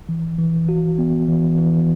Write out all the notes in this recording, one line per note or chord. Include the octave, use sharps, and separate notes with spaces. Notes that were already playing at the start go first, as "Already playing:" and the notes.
E3
E3
F#4
B3
E3
E3